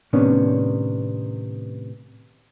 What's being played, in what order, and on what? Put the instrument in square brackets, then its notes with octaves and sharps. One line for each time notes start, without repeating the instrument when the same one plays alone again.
[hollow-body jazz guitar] A2 C3 D#3 B3 C#4 D4